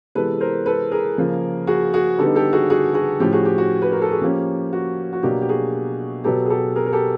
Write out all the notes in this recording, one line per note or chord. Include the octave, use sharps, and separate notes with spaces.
C3 E3 G#3 B3 A4 B4
A#4 C5
A4 B4
G#4 A#4
C#3 F3 A#3
F#4 G#4
F#4 G#4
D3 G3 B3 D#4 G4 A4
G4 A4
F#4 G#4
F#4 G#4
F#4 G#4
A2 F3 A3 C#4 G4
F#4 G#4
G4
F#4
B4
A#4
A4
G#4
F3 A#3 C#4 G4
F#4
F#4
B2 F#3 A#3 D4 G4
G4
F#4 G#4
B2 F#3 B3 G4 A4
G#4
G4 A4
G#4 A#4
A#4
G4 A4